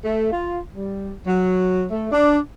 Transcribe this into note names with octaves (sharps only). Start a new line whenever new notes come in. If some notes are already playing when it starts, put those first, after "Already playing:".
A3
F4
G3
F#3
A3
D4